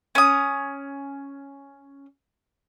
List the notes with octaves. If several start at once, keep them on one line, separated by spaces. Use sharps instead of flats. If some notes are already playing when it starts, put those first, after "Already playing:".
C#4 D#6